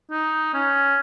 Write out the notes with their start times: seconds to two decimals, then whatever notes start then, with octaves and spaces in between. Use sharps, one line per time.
0.11 D#4
0.54 C#4